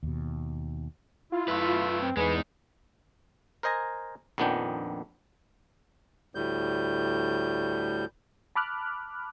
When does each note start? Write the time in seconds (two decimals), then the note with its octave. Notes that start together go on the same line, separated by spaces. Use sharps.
0.03 D#2 B2
1.32 E4 F4
1.48 F#2 A3 B4
2.01 C4
2.17 E2 G#3 D#4 G#4 B4
3.63 A#4 C5 D#5 G#5 A#5
4.38 A#1 F2 D#3 B3 D4 G5
6.35 D2 A2 G3 G6
8.55 A5 B5 D6 F6 F#6